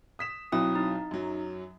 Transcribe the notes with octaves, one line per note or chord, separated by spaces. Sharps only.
D#6 B6 E7
B1 F#3 C4 E4 D#6
D#4
F#2 F#3